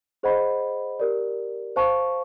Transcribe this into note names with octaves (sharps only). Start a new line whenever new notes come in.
G#4 C5 D#5 F#5 B5
G4 A#4 D5
C5 F5 A5 C#6